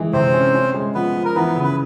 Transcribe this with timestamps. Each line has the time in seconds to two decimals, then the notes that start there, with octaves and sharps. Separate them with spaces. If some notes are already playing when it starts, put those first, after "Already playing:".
Already playing: E3 G#3
0.13 C3 C4 C5
0.33 C#4
0.54 C#4
0.74 G#3
0.94 F3 B3 B4
1.15 F3
1.25 A#4
1.35 E3 B3 B4
1.55 C#3
1.64 B4